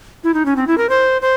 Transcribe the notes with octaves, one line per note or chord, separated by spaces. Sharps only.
E4
D#4
C#4
C4
E4
A#4
C5
C5